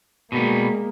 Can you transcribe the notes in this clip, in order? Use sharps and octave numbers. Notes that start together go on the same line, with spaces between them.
B2 G3 G#3 A#3 B3